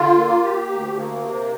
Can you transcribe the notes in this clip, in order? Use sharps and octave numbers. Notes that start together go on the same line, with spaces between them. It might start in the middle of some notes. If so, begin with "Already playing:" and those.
Already playing: D3 F4
A#3
G4
D2
A#3
C3